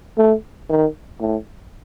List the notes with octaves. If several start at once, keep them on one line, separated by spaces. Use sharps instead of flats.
A3
D#3
A2